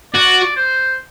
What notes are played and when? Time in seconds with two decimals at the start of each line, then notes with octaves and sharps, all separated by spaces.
0.13 F#4 D5
0.56 C5